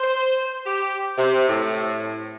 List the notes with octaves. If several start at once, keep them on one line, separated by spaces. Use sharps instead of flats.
C5
G4
C3
A2